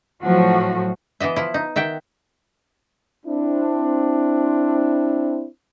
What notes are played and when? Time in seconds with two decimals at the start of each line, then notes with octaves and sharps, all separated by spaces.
0.22 A2 F3 F#3 F#4
1.20 E3 B3 D#5 E5
1.36 F3 E4
1.54 D#4
1.76 D#3 E5 F#5 G5
3.26 C4 D4 E4